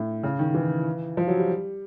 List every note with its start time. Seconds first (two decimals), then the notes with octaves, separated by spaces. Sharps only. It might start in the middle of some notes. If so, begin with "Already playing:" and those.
Already playing: A2
0.23 C#3
0.39 D#3
0.54 E3
1.17 F3
1.28 F#3
1.39 G3